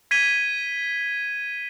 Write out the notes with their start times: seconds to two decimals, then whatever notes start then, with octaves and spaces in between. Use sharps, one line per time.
0.11 G#6 B6 D#7 G7